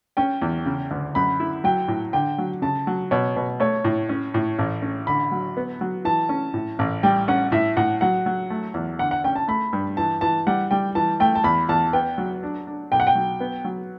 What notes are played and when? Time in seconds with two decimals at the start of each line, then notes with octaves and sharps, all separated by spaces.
0.17 C#4 G5
0.42 E2
0.66 C#3
0.91 D2
1.15 F#2 B5
1.40 E4
1.64 F#3 G5
1.88 A2
2.13 D3 G5
2.38 F#3
2.62 C#3 A5
2.87 F#3
3.11 B2 C#5
3.36 B2
3.60 A3 C#5
3.85 A2
4.09 C#4
4.34 A2
4.59 A1
4.82 C#4
5.07 D3 B5
5.31 F#3
5.57 B3
5.81 F#3
6.05 E3 A5
6.29 C#4
6.54 A2
6.79 A1
7.03 G3 G5
7.28 C#4 F#5
7.52 A2 E5
7.77 A2 F#5
8.01 F#3 F#5
8.26 F#3
8.50 A3
8.74 E2
8.99 D3 F#5
9.11 F#5
9.24 C#4 G5
9.36 A5
9.48 A3 B5
9.73 G2
9.97 E3 A5
10.21 E3 A5
10.47 G3 F#5
10.71 G3 G5
10.95 E3 A5
11.20 A3 G5
11.35 A5
11.44 E2 B5
11.69 E2 A5
11.93 B3 G5
12.18 F#3
12.43 D4
12.67 D4
12.92 B1 G5
13.00 F#5
13.07 G5
13.15 F#3
13.40 B3
13.65 F#3